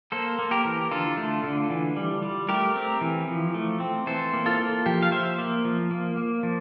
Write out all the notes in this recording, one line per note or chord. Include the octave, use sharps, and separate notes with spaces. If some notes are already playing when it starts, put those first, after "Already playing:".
A#3 A4 C5
A#3
G4 A#4
E3
D3 F4 A4
A3
D3
E3
G3
G3
A3 G4 A#4
C4
E3
F3
A3
C4
E3 A4 C5
A#3
F4 A4
A#3
F3 G4
F5
F3 C5 E5
A#3
F3
A#3
A#3
F3